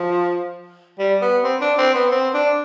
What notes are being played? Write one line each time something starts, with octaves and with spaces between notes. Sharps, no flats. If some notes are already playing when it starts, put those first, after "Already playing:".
Already playing: F3
G3
B3
C4
D4
C4
B3
C4
D4